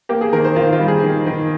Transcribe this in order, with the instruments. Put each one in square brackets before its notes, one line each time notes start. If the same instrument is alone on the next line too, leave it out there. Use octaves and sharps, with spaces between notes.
[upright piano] A#3 G4
G#4
D#3 A#4
C5
D#3 F4
F4
G3
G#4
D#3
D#3